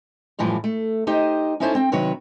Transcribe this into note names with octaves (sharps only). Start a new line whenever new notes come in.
F#2 A2 E3 F3 G3
A3
D#4 G4 C5 D#5
C#4 D#4 E4 A4 C5 C#5
C4 G5
C3 D#3 F#3 B4 C#5